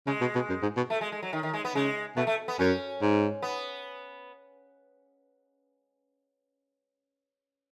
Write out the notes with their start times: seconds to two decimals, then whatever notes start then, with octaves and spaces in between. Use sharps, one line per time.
0.07 C#3 G#3
0.21 B2
0.35 B2
0.49 F#2
0.62 G#2
0.77 B2
0.90 A3
1.01 G#3
1.12 G#3
1.23 F#3
1.33 D#3
1.43 D#3
1.54 G#3
1.65 B3
1.75 C#3 G#3
2.16 B2 A3
2.27 A3
2.48 B3
2.59 F#2 C#4
3.01 G#2
3.42 B3